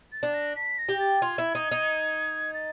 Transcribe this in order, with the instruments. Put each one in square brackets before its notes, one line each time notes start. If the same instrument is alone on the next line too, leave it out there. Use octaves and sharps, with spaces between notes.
[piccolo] A6
[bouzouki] D4
[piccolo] A#6
B6
A#6
[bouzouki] G4
[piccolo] A6
[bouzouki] F4 [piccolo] G#6
[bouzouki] E4
D#4
D#4
[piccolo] A6